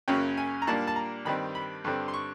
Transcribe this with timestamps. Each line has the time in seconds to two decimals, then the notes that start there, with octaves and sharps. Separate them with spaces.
0.08 F#2 C#3 F#3 A#3 C#4 G5
0.37 G#5
0.62 A#5
0.67 A#2 G3 A#3 D4 A5
0.87 A5
0.96 A#5
1.25 G2 D#3 G3 C4 B5
1.55 B5
1.84 G2 D3 G3 C4
2.08 C6
2.14 C#6